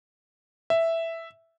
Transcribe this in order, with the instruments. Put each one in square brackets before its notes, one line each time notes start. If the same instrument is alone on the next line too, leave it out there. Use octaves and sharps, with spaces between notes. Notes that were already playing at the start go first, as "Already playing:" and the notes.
[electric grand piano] E5